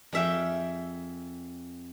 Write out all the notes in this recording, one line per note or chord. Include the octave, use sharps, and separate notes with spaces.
F2 G#4 E5 F5 G5